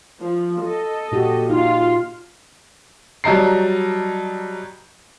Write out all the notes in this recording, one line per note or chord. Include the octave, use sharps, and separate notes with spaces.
F3
A4 D#5
A#2 F#4 G4
D#4 F4 F5
F#3 G3 D#5 A5 A#5 C7